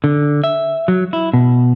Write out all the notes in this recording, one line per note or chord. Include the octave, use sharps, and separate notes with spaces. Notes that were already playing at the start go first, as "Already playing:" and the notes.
D3
E5
F#3
E4
B2